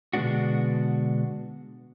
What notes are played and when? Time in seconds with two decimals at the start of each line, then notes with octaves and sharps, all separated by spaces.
0.13 B2 D3 G#3 B3 D4 F#4